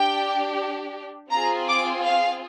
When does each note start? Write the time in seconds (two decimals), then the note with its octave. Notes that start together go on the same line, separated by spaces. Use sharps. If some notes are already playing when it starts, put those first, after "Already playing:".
Already playing: D4 G4 G5
1.31 C4 F4 G#4 A#5
1.68 D6
2.04 F5